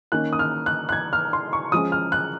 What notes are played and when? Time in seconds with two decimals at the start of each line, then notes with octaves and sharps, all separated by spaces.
0.12 D#3 A#3 C#4 F#6
0.33 D#6
0.39 F6
0.66 F#6
0.89 F#6
0.92 G#6
1.13 F6
1.33 C6
1.53 C#6
1.72 F3 G#3 C#4 D#6
1.92 F6
2.12 F#6